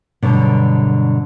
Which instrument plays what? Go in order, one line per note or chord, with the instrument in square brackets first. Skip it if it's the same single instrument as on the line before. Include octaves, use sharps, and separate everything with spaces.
[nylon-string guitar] G2 B2 D3 F#3